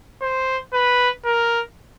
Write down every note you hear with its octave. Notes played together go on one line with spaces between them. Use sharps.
C5
B4
A#4